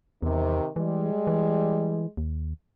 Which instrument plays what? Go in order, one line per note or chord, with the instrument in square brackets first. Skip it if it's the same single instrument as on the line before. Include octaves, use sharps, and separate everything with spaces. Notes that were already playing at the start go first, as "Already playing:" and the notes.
[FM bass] E2 [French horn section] C3 D#3
[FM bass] E3 [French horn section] G3 G#3
[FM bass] E3
D#2